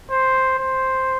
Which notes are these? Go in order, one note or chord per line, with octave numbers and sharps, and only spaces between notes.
C5
C5